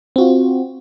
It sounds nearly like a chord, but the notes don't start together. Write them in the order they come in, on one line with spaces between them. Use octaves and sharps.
C4 F#4 F4